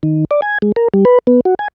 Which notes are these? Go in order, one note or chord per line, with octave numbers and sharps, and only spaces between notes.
D#3
D5
G#5
G#3
A#4
G3
B4
B3
F#4
G#5